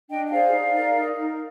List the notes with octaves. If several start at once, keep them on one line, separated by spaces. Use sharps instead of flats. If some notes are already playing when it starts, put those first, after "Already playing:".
D4 D#5 G5
G5
G#4 C5 D5 F5
D#4
A#4
D#4
A#4